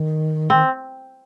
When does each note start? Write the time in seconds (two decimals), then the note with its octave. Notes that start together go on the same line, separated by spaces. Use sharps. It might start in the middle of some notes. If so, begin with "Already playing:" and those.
Already playing: D#3
0.50 D#3 C4